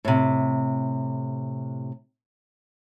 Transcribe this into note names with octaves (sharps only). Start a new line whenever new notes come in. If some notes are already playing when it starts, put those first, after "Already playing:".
A2 C3